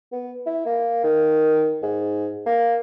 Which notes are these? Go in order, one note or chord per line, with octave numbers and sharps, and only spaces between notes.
B3
E4
A#3
D#3
G#2
A#3